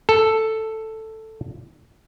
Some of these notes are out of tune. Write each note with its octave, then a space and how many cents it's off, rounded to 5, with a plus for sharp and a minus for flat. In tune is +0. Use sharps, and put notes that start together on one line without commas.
A4 +5